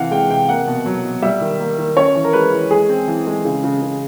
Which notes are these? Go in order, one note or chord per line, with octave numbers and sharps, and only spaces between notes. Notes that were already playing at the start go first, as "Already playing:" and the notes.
Already playing: C3 E3 F5 F#5
G#3 G5
C3 G5
A#3 F#5
B2
F#3
B2
G3 E5
D#3
A#3
D#3
C#4 C#5
E3
A#4
G#3 B4
E3
G#3 G#4
C4
E3
G#3
C#3
C#3
C#3